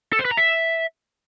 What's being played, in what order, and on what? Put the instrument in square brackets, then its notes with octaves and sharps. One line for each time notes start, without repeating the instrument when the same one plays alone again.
[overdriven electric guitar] A4
C5
B4
A#5
E5